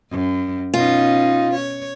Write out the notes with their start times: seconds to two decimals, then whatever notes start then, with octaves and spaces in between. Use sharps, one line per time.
0.11 F#2
0.74 B2 C#4 D#4 F4
1.55 C#5